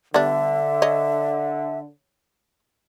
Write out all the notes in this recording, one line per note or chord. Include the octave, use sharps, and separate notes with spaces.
D3 G3 B3 D4 E5
C#5 D#5